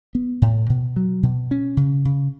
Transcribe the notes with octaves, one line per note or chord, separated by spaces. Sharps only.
B3
A2
B2
F#3
B2
C#4
C#3
C#3